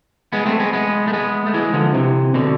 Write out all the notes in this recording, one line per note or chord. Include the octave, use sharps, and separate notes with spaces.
G#3 B3
A3 C4
G#3 B3
G#3 B3
A3
G#3 B3
A3
E3 G#3
D3 F3
C3 E3
B2 D3